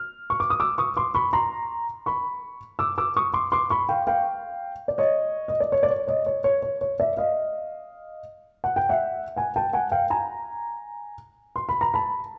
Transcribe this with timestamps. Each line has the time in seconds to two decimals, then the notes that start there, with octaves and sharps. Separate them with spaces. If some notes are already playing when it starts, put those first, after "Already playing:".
Already playing: F6
0.30 C#6
0.40 D6
0.50 D#6
0.60 D6 E6
0.78 C#6 D#6
0.97 C6 D6
1.15 B5 C#6
1.33 A#5 C6
2.06 B5 C#6
2.79 D6 E6
2.98 D6 E6
3.16 C#6 D#6
3.34 C6 D6
3.52 C6 D6
3.70 B5 C#6
3.89 F5 G5
4.07 F5 G5
4.88 D5
4.98 C#5 D#5
5.48 D#5
5.60 D5
5.72 C#5
5.83 D5
5.90 C#5
6.08 C#5 D#5
6.26 C#5
6.44 C#5
6.62 C#5
6.81 C#5
7.00 D5 E5
7.17 D#5 F5
8.64 F#5
8.76 G5
8.89 E5 F#5
9.36 F#5 G#5
9.56 G5 A5
9.73 F#5 G#5
9.92 F5 G5
10.10 G#5 A#5
11.56 C6
11.69 B5
11.81 A#5
11.94 A5 B5